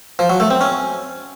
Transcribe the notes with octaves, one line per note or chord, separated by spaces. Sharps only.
F3
F#3
A3
C4
C#4